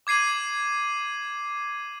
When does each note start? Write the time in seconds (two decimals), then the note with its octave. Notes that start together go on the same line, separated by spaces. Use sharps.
0.07 D6 G#6 C7 D#7 F#7